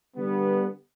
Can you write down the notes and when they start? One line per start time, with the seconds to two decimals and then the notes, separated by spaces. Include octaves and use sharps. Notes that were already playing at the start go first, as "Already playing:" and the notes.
0.16 D3 G3 B3